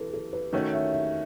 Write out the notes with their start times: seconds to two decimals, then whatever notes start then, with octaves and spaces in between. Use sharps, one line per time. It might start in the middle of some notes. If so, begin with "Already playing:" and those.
Already playing: E3 A4 B4
0.14 A4
0.33 B4
0.52 D#3 A3 C#4 F#4 C#5
0.73 E5
0.93 E5